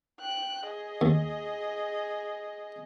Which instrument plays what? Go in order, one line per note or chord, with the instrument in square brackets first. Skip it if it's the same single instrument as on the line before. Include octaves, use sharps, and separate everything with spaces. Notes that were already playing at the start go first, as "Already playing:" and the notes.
[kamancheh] G5 F#6
G#4 D#5
[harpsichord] D#2